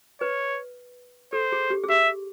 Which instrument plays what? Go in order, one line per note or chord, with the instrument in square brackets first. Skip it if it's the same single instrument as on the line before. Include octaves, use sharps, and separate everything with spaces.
[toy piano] B4 [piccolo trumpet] C#5
[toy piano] A4 [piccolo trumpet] C5
[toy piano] G#4
G4
G#4
[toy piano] G4 [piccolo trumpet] E5